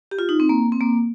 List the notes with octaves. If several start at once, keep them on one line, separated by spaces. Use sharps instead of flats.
G4
F4
D#4
C4
A#3
C4
A#3